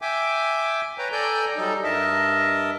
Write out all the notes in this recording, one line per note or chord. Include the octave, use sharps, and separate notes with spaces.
E5 G5 G#5 D6
B4 C#5 G5 A#5
A4 D5 G5 G#5 A#5 G6
F#3 G3 D#4 A4
G2 A#4 D#5 E5 A5